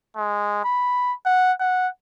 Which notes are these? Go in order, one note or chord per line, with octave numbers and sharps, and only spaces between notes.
G#3
B5
F#5
F#5